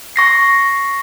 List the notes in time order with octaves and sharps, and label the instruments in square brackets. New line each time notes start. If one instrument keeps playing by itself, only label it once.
[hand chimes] C#6 A#6 C7